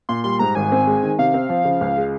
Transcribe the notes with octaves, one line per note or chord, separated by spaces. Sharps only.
A#2 C6
G3 C6
G#2 A#5
G#1 G#5
C4
G#3
D#3
C3 F5
C4
F3
C#3
C#2
G#3